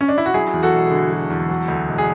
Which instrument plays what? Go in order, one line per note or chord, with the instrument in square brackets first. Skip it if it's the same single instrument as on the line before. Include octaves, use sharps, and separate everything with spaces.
[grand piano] C#4
D4
E4
F#4
F#3 E4 G#4
E2
F#4 A4
E1
D3
F#3
E2
F#3
D2
E1
G#4